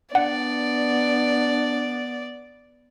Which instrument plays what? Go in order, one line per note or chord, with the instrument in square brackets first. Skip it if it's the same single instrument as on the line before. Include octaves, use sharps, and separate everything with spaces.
[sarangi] B3 [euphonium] D4 [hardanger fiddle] D5 [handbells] F#5